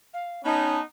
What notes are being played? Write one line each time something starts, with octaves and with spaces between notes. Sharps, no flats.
F5
B3 C#4 D#4 A5